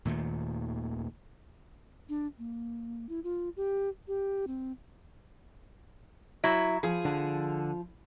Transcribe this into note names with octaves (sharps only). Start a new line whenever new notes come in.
D#2 A#2 D#3 A3
D4
A#3
E4
F4
G4
G4
C4
F#3 E4
F3 G#4
D3